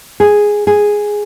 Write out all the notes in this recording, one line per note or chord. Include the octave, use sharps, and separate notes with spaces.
G#4
G#4